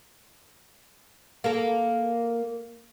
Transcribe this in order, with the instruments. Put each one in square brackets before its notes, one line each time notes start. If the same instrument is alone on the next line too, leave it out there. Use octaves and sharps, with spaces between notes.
[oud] A#3 A4